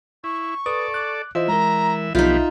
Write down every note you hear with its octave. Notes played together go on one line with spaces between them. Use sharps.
E4 C#6
A4 B4 D5 D#6
D6 F#6
E3 F4 C5 D#5 E5
G#3 A#4 A#5
B1 F3 B3 D#4 F4 G4 E5